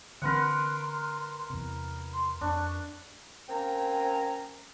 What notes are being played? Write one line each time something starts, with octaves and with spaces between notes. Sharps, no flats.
D3 E3 C4 A#4 B4 F#5 C6
E2 C3
C6
F2 D4 C#6
A#3 C4 C#4 G5 G#5 A#5